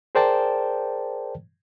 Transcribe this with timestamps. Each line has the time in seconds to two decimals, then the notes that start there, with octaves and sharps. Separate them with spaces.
0.15 G#4 A#4 C5 D5 G5 A5